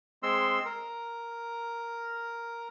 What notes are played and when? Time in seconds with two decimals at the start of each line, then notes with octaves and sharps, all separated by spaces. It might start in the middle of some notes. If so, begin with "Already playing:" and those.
0.23 G#3 C4 C6 E6
0.65 A#4